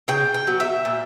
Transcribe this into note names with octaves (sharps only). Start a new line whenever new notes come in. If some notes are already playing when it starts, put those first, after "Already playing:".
C#3 G5
G5
F#3 B3
E5
A#2